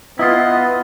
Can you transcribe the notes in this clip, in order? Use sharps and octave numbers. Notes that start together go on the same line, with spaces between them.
B3 E4 F4 D#5